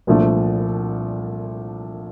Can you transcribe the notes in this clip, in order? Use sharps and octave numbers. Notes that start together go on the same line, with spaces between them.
C2 A#2 F3 A3 D4